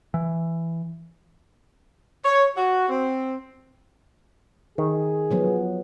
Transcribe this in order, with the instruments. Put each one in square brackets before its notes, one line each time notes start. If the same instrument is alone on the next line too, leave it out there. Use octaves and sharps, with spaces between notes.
[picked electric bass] E3
[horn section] C#5
F#4
C4
[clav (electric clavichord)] D#3 [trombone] G#4
[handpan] F3 F#3 B3